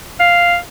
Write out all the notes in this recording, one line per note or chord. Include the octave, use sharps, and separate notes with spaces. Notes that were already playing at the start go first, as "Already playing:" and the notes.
F5